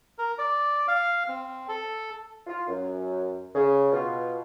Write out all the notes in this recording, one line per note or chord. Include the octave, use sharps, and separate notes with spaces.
A#4
D5
F5
C4
A4
F4
F#2
C#3
B2 F4